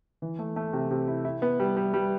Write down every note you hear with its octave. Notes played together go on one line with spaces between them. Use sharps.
E3
A3
A3
C3
C3
E4
E4
B3
G3
G3
G3